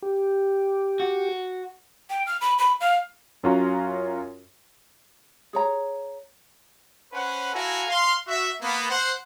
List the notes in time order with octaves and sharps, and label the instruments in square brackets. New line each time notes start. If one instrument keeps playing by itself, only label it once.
[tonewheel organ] G4
[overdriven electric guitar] F#4
[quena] G5
F6
B5
B5
F5
[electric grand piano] F#2 C#4 F4 F#4 A#5
[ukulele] G#4 C#5 A#5
[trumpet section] C#4 B4 C5 F#5
E4 F#4 A4 F5 G#5 A#5
F5 C6
F#4 E5
A#3 B3
C5 F#5